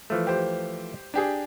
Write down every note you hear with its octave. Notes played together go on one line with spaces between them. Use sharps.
E3 F3 A3
G4 C5
D4 G4 G#4